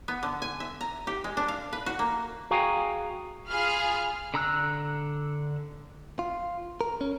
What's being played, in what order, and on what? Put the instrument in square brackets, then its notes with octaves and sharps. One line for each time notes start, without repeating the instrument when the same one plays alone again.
[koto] B3
D3
G#5
E5
A#5
G4
G#3
D4
F5
B4
F#4
A#3
[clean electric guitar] F#4 G#4 F5 G5 G#5 A#5
[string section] F4 G#4 F5 B5 F6
[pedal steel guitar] D3 A#5 E6 F#6
[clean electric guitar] F4
A#4
C#4